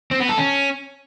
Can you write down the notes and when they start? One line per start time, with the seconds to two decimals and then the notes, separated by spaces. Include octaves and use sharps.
0.11 C4
0.20 B3
0.29 A4
0.38 C#4